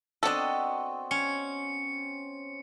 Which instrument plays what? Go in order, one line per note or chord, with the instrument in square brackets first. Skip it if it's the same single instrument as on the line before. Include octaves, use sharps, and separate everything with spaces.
[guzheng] B3 D#5 [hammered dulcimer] C4 F#4 [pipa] D4 A4
[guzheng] C#4 [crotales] C#7